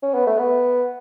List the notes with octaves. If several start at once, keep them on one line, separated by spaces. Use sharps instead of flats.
C#4
B3
A3
B3